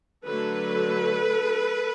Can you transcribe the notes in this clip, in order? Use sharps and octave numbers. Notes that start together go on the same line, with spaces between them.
D3 F#3 A3 A4 B4